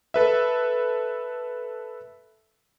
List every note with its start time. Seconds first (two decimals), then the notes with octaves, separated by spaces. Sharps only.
0.14 A4 B4 E5